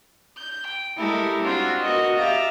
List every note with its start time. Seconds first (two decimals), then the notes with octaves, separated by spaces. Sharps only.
0.36 G6
0.65 G5
0.98 G#3 A3 E4 G4 A4 A#4
1.40 G#3 C4 D4 F4 F#4
1.81 B3 F#4 A#4 D#5
2.15 G4 E5 F5 A#5 A6